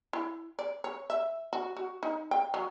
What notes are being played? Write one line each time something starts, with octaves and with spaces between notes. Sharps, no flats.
E4
D5
C#5
E5
F#4
F#4
D#4
G5
F#3